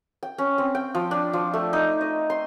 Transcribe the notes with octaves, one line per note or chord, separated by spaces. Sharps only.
G5
C#4
C4
G5
F3
D4
F3
A3
D#4
D#5
C6